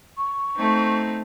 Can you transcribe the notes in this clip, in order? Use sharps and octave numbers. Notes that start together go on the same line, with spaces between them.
C#6
A3 C4 D#4